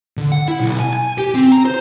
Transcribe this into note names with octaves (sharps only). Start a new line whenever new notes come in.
D3
F#5
E4
B1
G#5
G#5
G4
C4
A#5
C5